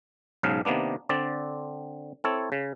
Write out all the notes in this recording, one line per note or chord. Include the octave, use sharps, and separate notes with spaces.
B1 G#2 C#3 F5
C3 D#3 A#3 B3 D4
D3 C4 D5
C4 E4 A4 C#5
C#3